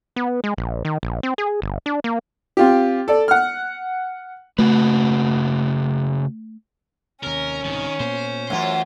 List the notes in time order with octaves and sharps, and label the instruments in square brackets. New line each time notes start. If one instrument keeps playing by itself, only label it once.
[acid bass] B3
G#3
A#1
D#3
A#1
C4
G#4
G1
D4
A#3
[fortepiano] C4 F4 G4
A4 D5
F#5 F6
[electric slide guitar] C#3 F#4 B4 [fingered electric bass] A3
[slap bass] D#2 C3 [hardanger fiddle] C#4 [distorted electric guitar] A#4
[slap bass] C2 G#2 B2 [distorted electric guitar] D#3
[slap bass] A#2 A#3 B3 [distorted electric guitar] C5
[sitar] F#2 F4 [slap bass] E3 A3